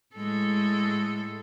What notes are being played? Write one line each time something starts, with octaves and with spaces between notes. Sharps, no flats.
A2 G#3 A4